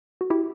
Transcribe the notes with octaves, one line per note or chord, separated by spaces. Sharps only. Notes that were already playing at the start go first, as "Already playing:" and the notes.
F#4
E4 G4